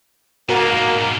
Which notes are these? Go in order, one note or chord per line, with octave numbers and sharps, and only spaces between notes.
G#2 B2 A#3 F#4 A#4 F#5